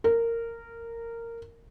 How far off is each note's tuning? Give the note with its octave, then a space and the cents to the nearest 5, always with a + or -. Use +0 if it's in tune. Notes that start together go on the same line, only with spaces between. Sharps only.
A#4 -15